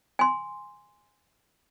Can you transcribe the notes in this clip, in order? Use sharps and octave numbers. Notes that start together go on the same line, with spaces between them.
G#5 C6